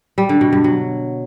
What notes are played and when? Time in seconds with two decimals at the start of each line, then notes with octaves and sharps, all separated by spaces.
0.18 G3
0.29 D3
0.41 B2
0.53 G2
0.64 F#3